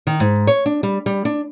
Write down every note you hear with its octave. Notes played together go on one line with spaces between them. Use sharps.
D#3
G#2
C#5
D4
G3
G3
D4